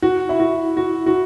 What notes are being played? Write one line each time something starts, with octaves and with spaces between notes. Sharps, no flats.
F#4
E4
F#4
F#4
F#4